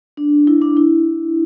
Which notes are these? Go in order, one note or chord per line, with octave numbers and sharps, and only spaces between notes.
D4
E4
D4
E4